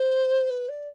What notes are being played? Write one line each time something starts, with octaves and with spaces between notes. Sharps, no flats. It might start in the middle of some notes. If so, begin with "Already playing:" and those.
Already playing: C5
B4
D5